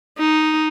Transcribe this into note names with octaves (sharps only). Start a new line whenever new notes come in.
D#4